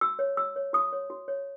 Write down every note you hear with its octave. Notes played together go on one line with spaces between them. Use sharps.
F#4 E6
C#5
F#4 E6
C#5
F#4 D#6
C#5
F#4
C#5